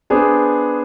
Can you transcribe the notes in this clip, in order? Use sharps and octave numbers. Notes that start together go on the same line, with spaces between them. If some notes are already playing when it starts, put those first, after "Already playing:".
B3 D4 G#4 C5